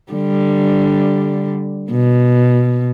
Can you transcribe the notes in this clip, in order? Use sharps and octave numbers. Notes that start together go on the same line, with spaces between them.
D3 G3
B2